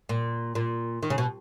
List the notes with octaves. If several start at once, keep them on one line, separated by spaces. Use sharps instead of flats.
A#2
A#2
D#3
C#3
B2